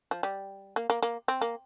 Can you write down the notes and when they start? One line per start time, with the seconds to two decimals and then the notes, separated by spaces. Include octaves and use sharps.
0.11 F3
0.23 G3
0.76 A#3
0.90 A#3
1.03 A#3
1.28 C4
1.41 A#3